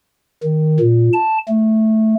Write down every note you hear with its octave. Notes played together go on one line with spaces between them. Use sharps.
D#3
A#2
A5
A3